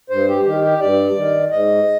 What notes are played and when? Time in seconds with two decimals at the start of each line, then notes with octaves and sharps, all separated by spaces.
0.10 G2 C5
0.28 G4
0.45 D#3 G4
0.64 G4
0.80 G2 D5
1.17 D#3
1.51 G#2 D#5